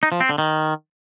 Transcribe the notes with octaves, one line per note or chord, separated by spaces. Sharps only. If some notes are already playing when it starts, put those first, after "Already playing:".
D#4
F3
C4
D3
D#3